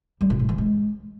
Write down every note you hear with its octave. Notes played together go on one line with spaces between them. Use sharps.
G3
A#2
A2
E3
G#3